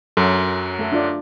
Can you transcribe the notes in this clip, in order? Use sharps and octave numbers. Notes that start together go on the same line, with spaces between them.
F#2 F#3 A4
A3 A4
D4 F4 D5